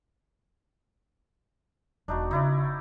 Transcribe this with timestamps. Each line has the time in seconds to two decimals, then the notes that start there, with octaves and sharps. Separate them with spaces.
2.08 E1 D4 D#4 F#4
2.31 C#3 D#4 E4 D5